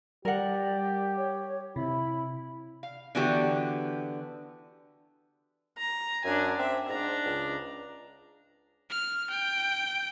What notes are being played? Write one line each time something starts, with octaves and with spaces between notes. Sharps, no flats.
G3 G4 A#4 D5 F#5
C#5
C3 E4 B5
F5
D3 E3 B3 D4 F#4 G4
A#5
F#2 D4 G#5
C4 E5
G#2 D4 A#5
C#2
F6
G5